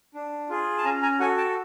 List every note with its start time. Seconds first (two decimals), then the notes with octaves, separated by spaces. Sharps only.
0.14 D4
0.49 F4 G#4
0.78 A5
0.84 C#4 G#5 A#5
1.02 G#5 A#5
1.20 F#4 A4 F#5 G#5
1.37 G5 A5